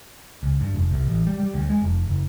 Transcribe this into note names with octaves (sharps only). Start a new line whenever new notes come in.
C#2
G2
F1
C2
A1
G3
G3
D2
G#3
F1
F#1